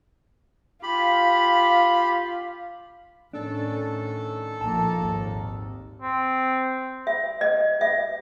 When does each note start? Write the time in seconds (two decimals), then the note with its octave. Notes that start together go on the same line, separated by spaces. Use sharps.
0.83 F4 G4 F5 B5
3.33 A2 D#3 C#4 D4 A4
4.61 A#1 A#3 A5
4.97 G#1 D#2
6.02 C4
7.07 E5
7.41 D#5
7.81 E5